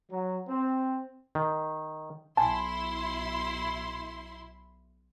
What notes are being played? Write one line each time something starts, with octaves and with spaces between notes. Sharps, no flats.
F#3
C4
D#3
B1 E4 G#5 A5 C6